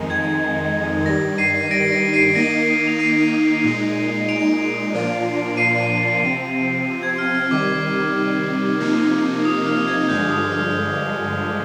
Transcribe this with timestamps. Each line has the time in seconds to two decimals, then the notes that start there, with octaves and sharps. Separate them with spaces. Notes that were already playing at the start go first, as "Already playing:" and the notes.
Already playing: F2 D#3 G#3 D#4
0.10 G#6
1.06 G2 D#3 G3 A#6
1.38 C7 D#7
1.71 A#6 D7
1.92 A#6 D7
2.14 C7 D#7
2.35 D#3 A#3 D#4 A#6 D7
2.87 F7
2.99 C7 D#7
3.64 A#2 G#3 D#4
4.29 D7 F7
4.93 A#2 F3 A#3 D4 F4
5.57 C7 D#7
6.22 C3 F3 C4
7.03 G#6
7.18 F6
7.35 F6
7.51 C3 D#3 G3 D6
8.80 C3 F3 A#3 D#4
9.45 D#6
9.67 F6
9.87 G#6
10.09 G2 D3 F3 G#3 G6
10.31 D#6
10.52 F6